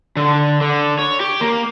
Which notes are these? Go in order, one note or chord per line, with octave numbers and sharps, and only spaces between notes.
D3
D3
C#5
G4
A#3